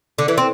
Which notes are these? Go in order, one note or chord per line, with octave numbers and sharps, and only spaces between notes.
D3
E3
C4